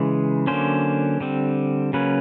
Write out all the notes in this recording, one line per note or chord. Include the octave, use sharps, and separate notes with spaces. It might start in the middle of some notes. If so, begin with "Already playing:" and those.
Already playing: C#3 E3 G#3
D3 F#3 A#3 C#4 C5
D3 G3 C4
C#3 F#3 A#3 C#4 B4